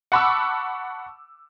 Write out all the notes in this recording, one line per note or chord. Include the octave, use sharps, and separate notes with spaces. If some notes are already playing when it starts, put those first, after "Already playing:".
F#5 A5 B5 C#6 D6 E6